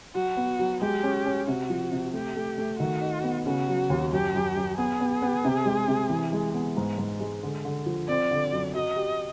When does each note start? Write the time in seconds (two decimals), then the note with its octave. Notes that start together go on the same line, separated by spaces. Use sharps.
0.15 F#3 F#4
0.37 B3
0.59 F#3
0.81 G#3 G4
1.03 C#4
1.25 C#4
1.48 C3 F#4
1.70 F3
1.92 C3
2.14 A3 G4
2.36 A3
2.58 A3
2.79 D#3 F#4
3.01 D#4
3.23 B3
3.46 C#3 F#4
3.68 F#3
3.90 D#2
4.12 F#2 G4
4.35 F#2
4.56 F#2
4.78 B3 G#4
5.01 B3
5.22 B3
5.45 C3
5.66 G#3
5.88 C3
6.10 E3
6.33 G#3
6.54 B3
6.77 G#2
6.98 G#2
7.20 G#3
7.43 D3
7.65 D3
7.86 F3
8.08 C4 D5
8.31 D3
8.53 F#2
8.74 F#3 D#5
8.96 G4